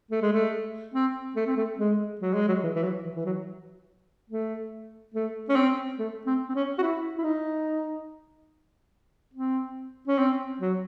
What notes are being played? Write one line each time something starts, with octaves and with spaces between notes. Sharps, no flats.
A3
G#3
A3
C4
A3
C4
A3
G#3
F#3
G#3
F#3
E3
E3
F#3
E3
E3
F#3
A3
A3
C#4
C4
A3
C4
C4
C#4
F#4
E4
E4
D#4
C4
C#4
C4
F#3